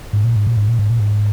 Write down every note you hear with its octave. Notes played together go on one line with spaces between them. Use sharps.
G#2
A#2
G#2
A#2
G#2
A#2
G#2
A#2
G#2